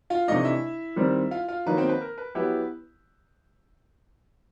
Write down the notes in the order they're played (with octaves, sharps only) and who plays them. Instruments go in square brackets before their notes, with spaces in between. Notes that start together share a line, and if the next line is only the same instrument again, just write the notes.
[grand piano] F4 F5
[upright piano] C3 E3 A3 D4 [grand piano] D#4 D#5
[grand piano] E4 E5
[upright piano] D#3 G3 C4
[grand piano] F4 F5
F4 F5
[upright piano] D#3 F#3 A#3 D#4 [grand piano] B4
[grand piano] C4 C5
B4
A#4
B4
[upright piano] F#3 B3 E4 G4 [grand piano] B4